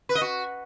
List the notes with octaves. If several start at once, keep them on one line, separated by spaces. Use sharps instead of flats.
B4
D#5
F#4